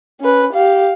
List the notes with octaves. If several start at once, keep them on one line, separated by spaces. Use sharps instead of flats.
C#4 B4
G4 F5